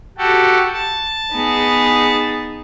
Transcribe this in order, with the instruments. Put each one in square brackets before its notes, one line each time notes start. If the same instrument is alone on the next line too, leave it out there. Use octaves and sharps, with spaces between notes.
[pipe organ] F#4 G4 A4
A5
[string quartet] B3 D#4 G#4